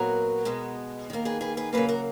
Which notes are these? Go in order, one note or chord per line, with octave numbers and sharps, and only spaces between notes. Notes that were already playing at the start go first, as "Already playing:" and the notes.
Already playing: A#2 F#3 B3 F#4 A#4
B2 G#3 B3
D#3 A#3 A#4
G#4 B4
G#4 B4
G#4 B4
C#3 F#3 A#3 G#4 B4
F#4 A#4